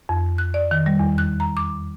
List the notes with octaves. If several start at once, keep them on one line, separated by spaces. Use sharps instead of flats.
F2
F#6
D5
D#3
G3
E2
F#6
A#5
D6